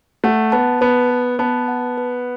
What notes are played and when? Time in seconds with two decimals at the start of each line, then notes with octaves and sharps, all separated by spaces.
0.24 A3 F#5
0.52 B3 A5
0.81 B3 B4
1.11 B4
1.39 B3 A5
1.68 F#5
1.98 B4